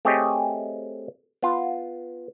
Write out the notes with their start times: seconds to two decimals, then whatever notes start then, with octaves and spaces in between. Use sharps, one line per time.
0.05 A3 C4 G4 G#4 C#5 D#5
1.43 B3 F4